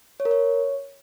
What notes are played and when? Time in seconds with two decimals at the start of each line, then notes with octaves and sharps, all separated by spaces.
0.20 C#5
0.25 A#4
0.31 C#5